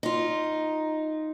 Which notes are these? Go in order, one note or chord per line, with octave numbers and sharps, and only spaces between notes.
D#4 F4